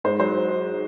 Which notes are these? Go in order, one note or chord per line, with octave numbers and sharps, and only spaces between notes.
G#2 C5
F#3 C5